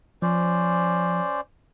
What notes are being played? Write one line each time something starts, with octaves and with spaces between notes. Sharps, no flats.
F3 C#4 C5 D5